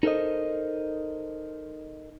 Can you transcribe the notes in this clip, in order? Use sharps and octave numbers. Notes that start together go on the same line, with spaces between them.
D#4 A4 A#4 C5 D#5